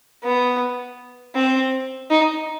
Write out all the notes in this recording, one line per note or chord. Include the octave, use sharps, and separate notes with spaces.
B3
C4
D#4